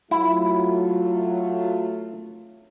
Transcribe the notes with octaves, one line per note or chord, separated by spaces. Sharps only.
F#3 A3 E4 F4